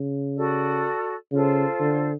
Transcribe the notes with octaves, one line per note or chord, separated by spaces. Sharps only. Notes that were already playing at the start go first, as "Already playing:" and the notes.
Already playing: C#3
F#4 A4 D5
C#3 F4 A4 C5
D3